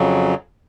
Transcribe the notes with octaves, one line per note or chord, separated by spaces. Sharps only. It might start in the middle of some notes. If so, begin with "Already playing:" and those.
Already playing: F2 C#3 F#3